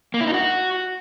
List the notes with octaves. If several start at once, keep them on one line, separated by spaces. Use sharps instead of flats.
A#3
E4
D#4
F#4